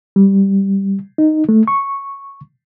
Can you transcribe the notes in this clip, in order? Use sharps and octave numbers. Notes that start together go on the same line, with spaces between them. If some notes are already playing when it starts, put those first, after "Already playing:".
G3
D#4
A3
C#6